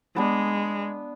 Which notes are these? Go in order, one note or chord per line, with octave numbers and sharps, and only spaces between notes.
G#3 B3 D4